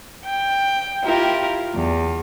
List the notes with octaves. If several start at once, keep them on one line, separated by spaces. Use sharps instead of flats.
G5
E4 F4 G4 A#4
E2